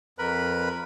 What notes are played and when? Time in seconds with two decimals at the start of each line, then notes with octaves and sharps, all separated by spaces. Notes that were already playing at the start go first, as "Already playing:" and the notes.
0.19 F2 A#4 B4 B5